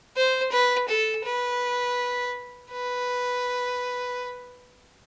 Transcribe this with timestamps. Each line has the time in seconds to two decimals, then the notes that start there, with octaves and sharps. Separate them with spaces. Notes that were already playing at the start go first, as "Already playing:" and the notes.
0.16 C5
0.51 B4
0.88 A4
1.25 B4
2.71 B4